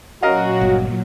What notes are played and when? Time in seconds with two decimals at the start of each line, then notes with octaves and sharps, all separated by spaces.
0.23 A#2 F#3 C#4 F#4 A#4 D#5 F5
0.61 G1